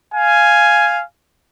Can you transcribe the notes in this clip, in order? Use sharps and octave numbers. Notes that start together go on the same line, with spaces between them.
F5 G#5